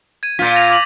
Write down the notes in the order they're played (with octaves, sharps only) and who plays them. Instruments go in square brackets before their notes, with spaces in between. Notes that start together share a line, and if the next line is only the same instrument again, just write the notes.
[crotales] G#6 D#7
[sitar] A#2 F4 [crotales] G6 A6 B6
[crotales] G#6 A#6 F7
D6 B6 F#7